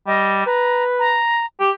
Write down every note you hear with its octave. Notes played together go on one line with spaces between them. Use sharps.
G3 D#5
B4 A#5
A#5
G4